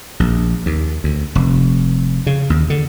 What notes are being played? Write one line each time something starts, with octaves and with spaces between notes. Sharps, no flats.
A#1
D#2
D2
F1
C#3
D#2
D3